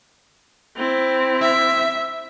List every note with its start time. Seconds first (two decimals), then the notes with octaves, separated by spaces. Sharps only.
0.76 C4 E4
1.42 E5